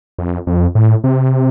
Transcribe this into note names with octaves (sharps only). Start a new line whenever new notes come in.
F2
F2
A2
C3